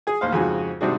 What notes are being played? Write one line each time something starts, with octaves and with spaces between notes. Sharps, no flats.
G#4 G#5
A1 D#2 C5 F5
F2 G#2 C#3 F#4 G#5
G#2 C3 G3 D4 F#4 G#4